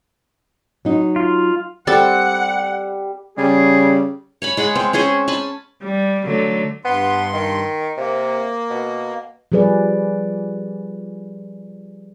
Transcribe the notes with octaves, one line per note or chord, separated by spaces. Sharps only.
F#3 D#4
F4
G3 C4 A4 F#5 A5
C#3 G3 G#4
C#5 G#5 B5
G#3 G#4 F#5 B5
C4
C4 C#4 G#4 C5
G#5 A5 B5
G3
D3 F#3 A3
G2 B3 C6
D#3
C3 A#3
B2
F3 G3 G#4 B4 D5